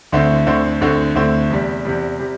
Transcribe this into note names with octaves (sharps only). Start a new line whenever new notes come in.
D2 D3 A3 C4 E4
D2 D3 A3 C4 E4
D2 D3 A3 C4 E4
D2 D3 A3 C4 E4
E2 C3 G3
E2 C3 G3
C3 G3